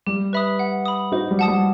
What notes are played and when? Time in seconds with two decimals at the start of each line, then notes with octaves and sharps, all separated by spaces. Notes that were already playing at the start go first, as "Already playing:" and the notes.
0.07 G3 G4
0.33 B4 E5 B5 D#6
0.59 F#5
0.86 B5 D#6
1.12 D#4 F#4 C5
1.31 G3
1.39 F#5 A5 D#6
1.48 G3